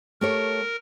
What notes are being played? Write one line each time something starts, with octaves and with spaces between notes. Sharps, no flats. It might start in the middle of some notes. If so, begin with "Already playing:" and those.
A3 G4 A#4 C#5